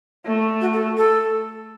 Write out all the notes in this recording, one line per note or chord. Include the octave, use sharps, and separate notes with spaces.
A3
F#4
A4
A4